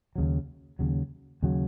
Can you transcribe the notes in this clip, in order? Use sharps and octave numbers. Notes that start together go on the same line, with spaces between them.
D#2 C#3 F#3
D#2 C#3 F#3
D#2 C#3 F#3